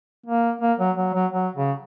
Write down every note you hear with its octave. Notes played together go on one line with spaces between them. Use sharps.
A#3
A#3
F#3
F#3
F#3
F#3
C#3